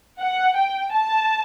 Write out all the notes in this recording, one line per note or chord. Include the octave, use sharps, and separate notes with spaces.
F#5
G5
A5